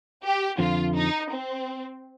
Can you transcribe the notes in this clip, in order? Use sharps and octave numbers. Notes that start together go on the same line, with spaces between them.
G4
F2 D3 F3 F4
D#4
C4